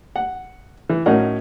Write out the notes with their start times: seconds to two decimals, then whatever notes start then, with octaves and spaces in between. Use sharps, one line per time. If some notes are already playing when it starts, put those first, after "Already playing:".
0.16 F#5
0.89 E3
1.06 A2 F#3 C#4 D#4 A#4 F#5